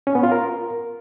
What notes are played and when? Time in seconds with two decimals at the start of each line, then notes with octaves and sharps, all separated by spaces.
0.07 C#4
0.15 B3
0.23 F4
0.32 A#4